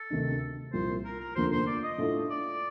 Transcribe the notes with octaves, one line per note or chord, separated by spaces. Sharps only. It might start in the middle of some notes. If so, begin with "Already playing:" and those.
Already playing: A4
D2 C3 D#3 A3 D#4
C2 A#2 F3 A#3 C5
A#4
A#4
F1 D#2 D3 F3 A#3 C5
C5
D5
D#5
A2 A3 D4 F4 A4
D5